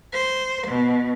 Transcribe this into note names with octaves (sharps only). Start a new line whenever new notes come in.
C5
B2